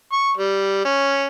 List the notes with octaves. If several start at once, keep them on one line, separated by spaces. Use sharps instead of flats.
C#6
G3
C#4